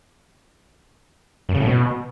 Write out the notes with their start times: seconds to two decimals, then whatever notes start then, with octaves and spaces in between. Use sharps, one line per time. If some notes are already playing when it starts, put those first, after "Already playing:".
1.49 F#2
1.55 C#3
1.60 A2
1.66 B2